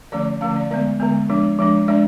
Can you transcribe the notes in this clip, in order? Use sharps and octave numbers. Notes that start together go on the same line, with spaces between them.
D3 F3 A3 C#4 D5
D3 F3 A3 C#4 F5
D5
D3 G#3 B3 D5
D3 G#3 B3
F3 G#3 D4
F3 G#3 D4
G#3 D4 D5